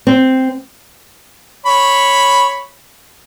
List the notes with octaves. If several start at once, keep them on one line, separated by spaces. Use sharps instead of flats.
C4
C#5 B5